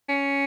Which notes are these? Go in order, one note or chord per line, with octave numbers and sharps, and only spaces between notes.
C#4